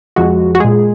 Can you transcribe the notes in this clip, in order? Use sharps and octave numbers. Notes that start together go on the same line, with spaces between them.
F2 F3 G#3 F#4
F#4
A#2 G#3 G#4